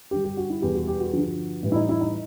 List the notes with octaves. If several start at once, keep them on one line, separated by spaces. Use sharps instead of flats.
G2 D3 G3 G4
G4
F#4
E4
E2 B2 G3 G4
F#4
G4
F#4
G2 D3 F3
A2 E3 G3
E4
D#4
E4
D#4